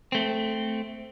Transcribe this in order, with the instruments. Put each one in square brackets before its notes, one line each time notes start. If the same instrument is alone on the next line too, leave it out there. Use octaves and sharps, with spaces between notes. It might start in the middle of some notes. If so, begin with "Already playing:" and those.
[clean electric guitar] A3 C4